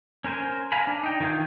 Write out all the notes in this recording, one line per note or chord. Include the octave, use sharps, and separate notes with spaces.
C#4 A#4 C5 G#5
F5 G#5 A#5 B5
D4
D#4 G5
D#3 E3 F4 G#4 G6